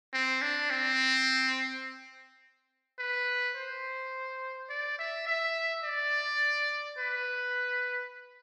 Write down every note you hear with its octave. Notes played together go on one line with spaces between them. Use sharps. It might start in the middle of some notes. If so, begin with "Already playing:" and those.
C4
D4
C4
B4
C5
D5
E5
E5
D5
B4